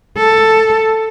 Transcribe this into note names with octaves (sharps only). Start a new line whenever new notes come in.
A4